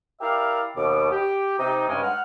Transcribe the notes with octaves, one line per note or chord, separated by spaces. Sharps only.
E4 G4 A#4 D5 E5 F5
D#2 B2 D6
G4
C3 D#4
G2 C#3 G#3
F#5 F6